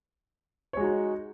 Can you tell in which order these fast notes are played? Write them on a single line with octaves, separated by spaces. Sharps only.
C#5 G#3 F#4 D#4